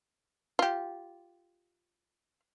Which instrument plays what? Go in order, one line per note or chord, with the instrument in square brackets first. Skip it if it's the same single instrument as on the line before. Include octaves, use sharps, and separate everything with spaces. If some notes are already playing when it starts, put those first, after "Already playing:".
[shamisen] F4 G4